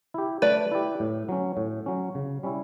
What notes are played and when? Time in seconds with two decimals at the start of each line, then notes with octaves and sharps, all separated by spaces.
0.14 E4 G4
0.42 A3 B4 D5
0.71 E4 G4
1.00 A2
1.29 F#3 C#4
1.57 A2
1.86 F#3 C#4
2.15 C#3
2.43 G3 C#4 E4